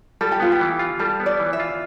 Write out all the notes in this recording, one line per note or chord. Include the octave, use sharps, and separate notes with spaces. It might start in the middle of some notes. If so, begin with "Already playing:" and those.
G3 A4
G4
B3 F4
G4
E3
F4
G3 A4
B3
D5
E3
E5
F4